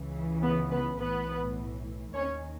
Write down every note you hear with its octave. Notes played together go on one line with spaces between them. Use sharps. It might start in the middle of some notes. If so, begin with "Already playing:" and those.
Already playing: C#2 C#3 E3
B3 B4
B3 B4
B1 A2 E3 B3 B4
D#2 D#3 C#4 C#5